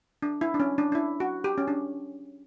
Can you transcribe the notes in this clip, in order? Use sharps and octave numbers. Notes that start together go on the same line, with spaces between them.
D4
E4
D4
C#4
D4
D4
E4
F#4
G4
C#4
D4